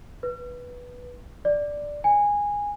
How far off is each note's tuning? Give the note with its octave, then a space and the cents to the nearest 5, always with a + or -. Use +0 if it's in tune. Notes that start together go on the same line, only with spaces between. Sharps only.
B4 -10
D5 +0
G#5 -15